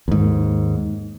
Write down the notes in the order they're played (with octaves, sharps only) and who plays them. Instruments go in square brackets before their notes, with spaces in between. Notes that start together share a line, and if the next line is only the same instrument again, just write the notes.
[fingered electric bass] D#2 G#2